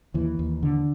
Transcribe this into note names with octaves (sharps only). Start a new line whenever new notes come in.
D#2 E3
D#2
D3